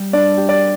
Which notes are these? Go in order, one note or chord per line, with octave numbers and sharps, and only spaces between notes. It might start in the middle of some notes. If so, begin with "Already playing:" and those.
Already playing: G3 G4
D4 D5
G4
D5